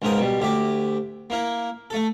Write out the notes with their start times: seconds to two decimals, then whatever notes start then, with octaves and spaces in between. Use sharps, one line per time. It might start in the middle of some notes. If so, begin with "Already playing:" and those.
0.02 C#2 G#2 C#3 A#4 G5 D#6
0.18 B2 G3
0.40 D2 G4 E5 D6
1.30 A#3 E4 A#4
1.90 A3 A4